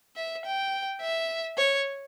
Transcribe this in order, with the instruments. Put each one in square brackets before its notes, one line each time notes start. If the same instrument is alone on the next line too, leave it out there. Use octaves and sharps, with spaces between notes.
[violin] E5
G5
E5
C#5